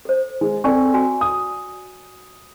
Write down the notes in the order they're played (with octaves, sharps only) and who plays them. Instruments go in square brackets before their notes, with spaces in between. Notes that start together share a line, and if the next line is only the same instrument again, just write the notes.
[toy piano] A4 C5
[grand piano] G#3
[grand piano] C4 A4 [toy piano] D5 G#5 C#6
[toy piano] F#4 G#5
[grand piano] D#6